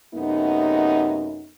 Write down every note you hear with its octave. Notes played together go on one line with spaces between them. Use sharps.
F#2 C3 A3 B3 D#4